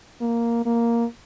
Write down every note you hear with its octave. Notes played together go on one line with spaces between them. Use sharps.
A#3
A#3